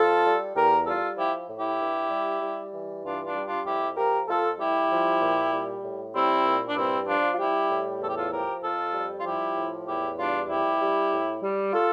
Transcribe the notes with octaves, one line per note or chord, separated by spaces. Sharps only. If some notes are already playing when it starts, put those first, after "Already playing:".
Already playing: F2 F4 A4
G3
E2 G4 A#4
G3 F4 A4
F3 E4 G4
A2
E4 G4
G2
G3
G3
E3
G2 D4 F4
D4 F4
G3
D4 F4
F2 E4 G4
F3 G4 A#4
F2 F4 A4
G3 E4 G4
F3
A#2
G3
A2
G3 C4 E4
A#2
D4
G2 C4 E4
F3 D4 F4
F4
G3 E4 G4
A2
E2 A4
G4
F4 A4
F3 G4 A#4
F2 F4 A4
G3
F4
F3 E4 G4
A2
E2 E4 G4
G3 D4 F4
F2 E4 G4
G3
A2
G3
F4 A4